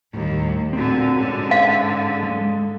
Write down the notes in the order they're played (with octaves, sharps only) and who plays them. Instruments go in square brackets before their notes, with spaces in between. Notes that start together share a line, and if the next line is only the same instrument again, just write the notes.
[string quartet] D#2 [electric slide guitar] A2 G3
[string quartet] A#2 D3 [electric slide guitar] C4 F#4
[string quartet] G#2 D3 [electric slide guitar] C#4 G#4 C#5
[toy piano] F5
[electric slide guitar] G#3 A4